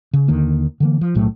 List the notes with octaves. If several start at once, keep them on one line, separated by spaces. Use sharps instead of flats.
C#3
D#2 D3 D#3 A#3
D3 E3 A#3
F3
B1 A2 F#3 A3